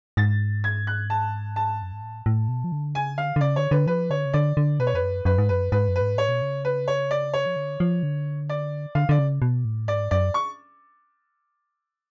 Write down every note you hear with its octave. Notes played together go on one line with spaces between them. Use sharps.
G#2 A6
G#6
F#6
A5
A5
F#2
G#2
A2
A2
B2
F3
D3
C#3 G#5
D3 F5
D3
C#3 D5
D3 C#5
D3 B4
F3 B4
D3 C#5
C#3
D3 D5
D3
B2 B4
C#5
F2 B4
F#2
F#2 B4
G#2
F#2 B4
G#2 B4
F#2
B4
G#2
A2 C#5
B2
C#3
B4
C#5
D5
C#5
F3
D3
F3
D3
D5
D3 F5
D3 D5
C#3
B2
A2
G#2 D5
F#2 D5
C#6